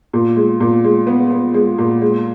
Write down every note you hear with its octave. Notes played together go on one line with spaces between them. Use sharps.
A#2
G#3
A#2
G#3
B3
B3
G#3
A#2
G#3